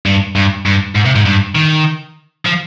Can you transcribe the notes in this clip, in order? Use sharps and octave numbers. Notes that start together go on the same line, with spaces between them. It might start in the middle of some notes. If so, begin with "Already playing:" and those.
G2
G2
G2
G#2
C3
G#2
G2
D#3
F3